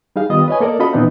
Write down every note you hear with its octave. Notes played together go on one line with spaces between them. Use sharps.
G3 D#4 G#4 F5
D#3 G3 B3 F4 D#5 D#6
B4 C#5 D#5 G#5
A#3 A4 A#4 D5 D#5
C#4 F4 F#4 A4 D#5 B5
A#2 E3 B3 C4 D4 D#4